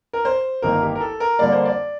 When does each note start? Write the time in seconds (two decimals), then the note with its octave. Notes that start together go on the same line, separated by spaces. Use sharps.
0.13 A#4
0.25 C5
0.62 G1 F2 D#3 A#3 A#4
0.82 G4
0.95 A#4
1.01 A4
1.20 A#4
1.39 F2 D3 G3 A#3 D5
1.52 C5
1.65 D5